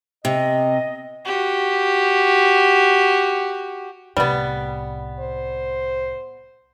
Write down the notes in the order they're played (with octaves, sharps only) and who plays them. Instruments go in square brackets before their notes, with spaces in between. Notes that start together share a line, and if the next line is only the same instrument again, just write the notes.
[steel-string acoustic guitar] C3 [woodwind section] D#5
[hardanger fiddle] F#4 G4
[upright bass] C2 A2 [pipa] G3 B3
[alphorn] C5